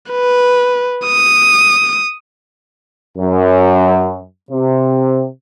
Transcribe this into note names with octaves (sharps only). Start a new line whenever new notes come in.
B4
D#6
F#2
C3